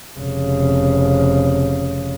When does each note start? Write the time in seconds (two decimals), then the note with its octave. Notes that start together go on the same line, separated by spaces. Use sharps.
0.18 F1 C#3